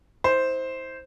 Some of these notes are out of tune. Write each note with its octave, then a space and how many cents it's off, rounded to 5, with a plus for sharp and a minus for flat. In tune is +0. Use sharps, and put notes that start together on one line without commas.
E4 -40 C5 +0